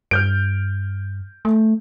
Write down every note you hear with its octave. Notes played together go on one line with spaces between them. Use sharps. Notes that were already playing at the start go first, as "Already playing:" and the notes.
G2 F6 G6 D7
A3